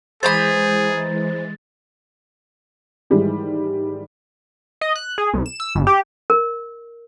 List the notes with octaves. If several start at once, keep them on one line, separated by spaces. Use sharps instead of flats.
E3 G#3 G#4 C5 A#5 B5 A6
G#2 D#3 E3 G3 G#3
D#5
F#6
G#4
C2
E7
E6
G1
G4
A#4